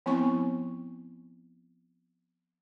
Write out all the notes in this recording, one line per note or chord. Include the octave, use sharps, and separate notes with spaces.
F3 B3 C4 E4 C#6